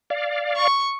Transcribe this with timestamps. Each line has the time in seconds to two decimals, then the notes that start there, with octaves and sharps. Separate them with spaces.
0.10 D5 F5
0.56 C#6